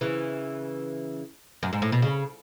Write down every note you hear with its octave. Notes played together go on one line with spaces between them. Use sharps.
C#3 E3
F#2
G#2
A2
B2
C#3